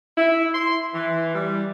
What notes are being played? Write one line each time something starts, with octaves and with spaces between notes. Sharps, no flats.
E4
C6
E3
G3